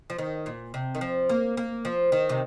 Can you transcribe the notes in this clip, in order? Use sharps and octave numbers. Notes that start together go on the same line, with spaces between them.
F3
D#3
A#2
C3
D#3
F3
A#3
A#3
F3
D#3
C3